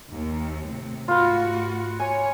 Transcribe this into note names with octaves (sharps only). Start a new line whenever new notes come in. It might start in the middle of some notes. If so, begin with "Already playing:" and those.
D#2
A2 C3
G#2 A3 F4 F#4 B4
C#5 G#5